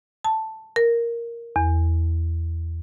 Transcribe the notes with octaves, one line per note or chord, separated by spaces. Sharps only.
A5
A#4
E2